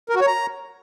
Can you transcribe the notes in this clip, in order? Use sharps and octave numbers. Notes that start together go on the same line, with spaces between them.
A#4
F#4
C#5
A#5